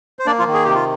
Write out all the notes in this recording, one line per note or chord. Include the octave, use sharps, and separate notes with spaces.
C5
A#3 D4 D5
F3 F4
D#3
G#4
C3 G4
F4